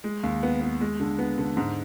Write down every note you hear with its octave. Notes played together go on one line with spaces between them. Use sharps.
G#3
D#2
B3
B3
G#3
D3
B3
D3
G#2